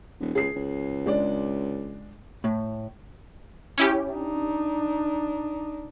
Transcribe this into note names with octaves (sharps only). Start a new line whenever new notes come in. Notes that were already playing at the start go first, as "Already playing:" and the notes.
D#1
C#2 G#4 C7
C#2
G#3 D4 D5
A2
C#4 E4 G4
D4 D#4